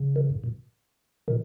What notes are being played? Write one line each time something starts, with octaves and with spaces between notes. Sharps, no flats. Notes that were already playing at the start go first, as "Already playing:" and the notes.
Already playing: C#3
D#3
G#2
A#2
A#2 D#3